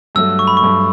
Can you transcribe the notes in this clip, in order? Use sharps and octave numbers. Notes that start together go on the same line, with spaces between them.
G2 F#3 A3 E6
C#6
B5
C#6
G2 F#3 A3